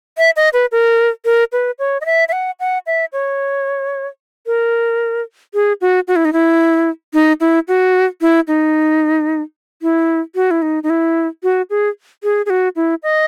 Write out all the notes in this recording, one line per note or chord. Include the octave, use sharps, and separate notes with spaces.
E5
D#5
B4
A#4
A#4
B4
C#5
D#5
E5
E5
F#5
F#5
E5
C#5
A#4
G#4
F#4
F#4
E4
D#4
E4
D#4
E4
F#4
E4
D#4
E4
F#4
E4
D#4
D#4
E4
F#4
G#4
G#4
G#4
F#4
E4
D#5